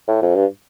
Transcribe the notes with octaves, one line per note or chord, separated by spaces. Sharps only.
A2
F2
G2